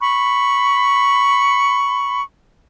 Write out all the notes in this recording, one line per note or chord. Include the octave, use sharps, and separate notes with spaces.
B5 C#6